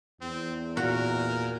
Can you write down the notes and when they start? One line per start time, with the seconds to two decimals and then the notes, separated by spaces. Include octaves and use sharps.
0.21 E2 C4
0.77 A#2 F#4 A#4